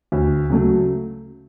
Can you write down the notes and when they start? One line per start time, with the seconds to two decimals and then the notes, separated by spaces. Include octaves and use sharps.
0.12 D2
0.50 C#3 F#3 A3